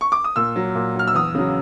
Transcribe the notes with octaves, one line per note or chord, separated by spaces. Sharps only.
C#6
D6
D#6
A#2 E6
F#3
A#2
F#3 F6
E6
E2 D#6
C#3 F#3